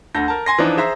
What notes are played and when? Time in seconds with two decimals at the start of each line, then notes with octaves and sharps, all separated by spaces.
0.15 D2 D3 A5 G6 A#6
0.28 A#4 A5
0.46 G#5 C6 A#6
0.58 E3 F3 D4 D#4
0.77 G#4 C5 E5 A#5